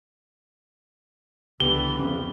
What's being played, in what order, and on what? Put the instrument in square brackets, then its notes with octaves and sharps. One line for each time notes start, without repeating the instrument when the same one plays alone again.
[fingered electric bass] C#2 [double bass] D3 E3 [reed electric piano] B3 G4 [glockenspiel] G7
[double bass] F2 [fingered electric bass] C#4